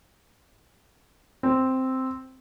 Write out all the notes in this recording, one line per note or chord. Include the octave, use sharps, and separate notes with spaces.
C4